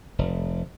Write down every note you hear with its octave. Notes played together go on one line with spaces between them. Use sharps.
F1